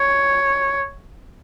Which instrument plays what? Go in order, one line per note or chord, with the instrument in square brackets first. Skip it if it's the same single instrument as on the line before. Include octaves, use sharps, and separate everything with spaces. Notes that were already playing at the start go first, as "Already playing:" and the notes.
Already playing: [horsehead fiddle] C#5